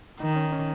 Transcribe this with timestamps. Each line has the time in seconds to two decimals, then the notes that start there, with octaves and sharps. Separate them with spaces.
0.20 D#3 D#4
0.36 C#4
0.52 C#4